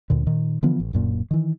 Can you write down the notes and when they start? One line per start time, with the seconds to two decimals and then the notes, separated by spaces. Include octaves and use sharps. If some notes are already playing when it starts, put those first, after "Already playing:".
0.10 D2 A#2 D3
0.26 A#2 D#3
0.63 D3 E3 F3 B3
0.80 A1
0.93 D1 F#2 A#2
1.31 D#3 E3